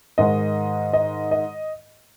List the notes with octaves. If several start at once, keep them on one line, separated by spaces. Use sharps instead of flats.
G#2 D#3 G#3 D#5
D#5
D#5